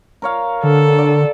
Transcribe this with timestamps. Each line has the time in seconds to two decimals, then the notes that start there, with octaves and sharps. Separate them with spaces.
0.22 A#4 C#5 F5
0.64 D3 A4
0.98 D5